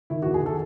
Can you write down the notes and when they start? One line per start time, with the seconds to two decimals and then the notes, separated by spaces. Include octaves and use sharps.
0.10 D#3 E4
0.22 F#4
0.26 E2
0.34 G#4
0.42 D#3 A4